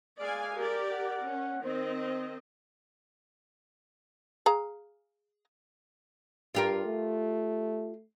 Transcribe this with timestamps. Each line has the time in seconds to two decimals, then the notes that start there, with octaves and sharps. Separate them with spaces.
0.20 G#3 D5 F5 G#5
0.57 G4 A#4 D5
0.92 F#5
1.26 C#4
1.64 D#3 C4 C5 D#5
4.46 G#4 F5 A#5
6.55 G2 F4 G4 A#4
6.86 A3